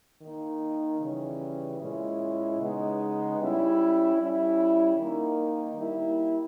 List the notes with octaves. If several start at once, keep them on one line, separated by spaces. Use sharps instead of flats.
D#3 A#3 D#4
C#3 E3 G3 C#4
A#2 G#3 C#4 E4
C#3 G#3 B3 D#4
G3 C#4 E4
G3 C#4 E4
D#3 A#3 D#4
G3 A#3 E4